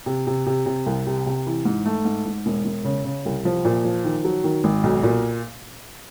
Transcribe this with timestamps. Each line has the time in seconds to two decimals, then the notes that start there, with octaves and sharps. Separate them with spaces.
0.06 C3
0.27 C3
0.46 C3
0.66 C3
0.86 C2
1.06 C3
1.26 C3
1.46 E3
1.65 G#2
1.86 A3
2.05 G#2
2.25 G#2
2.46 E1
2.65 E1
2.84 C#3
3.04 C#3
3.25 C2
3.45 F3
3.65 A#2
3.85 F3
4.05 D#3
4.24 F#3
4.44 D#3
4.64 G#1
4.83 B1
5.03 A#2